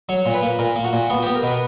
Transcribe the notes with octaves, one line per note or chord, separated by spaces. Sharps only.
F#3 C#5
A#2
B4
A#3
A#2 A#4
A#3
F#4
A#2
B3 F#4
B3 G4
A#4
B2 B4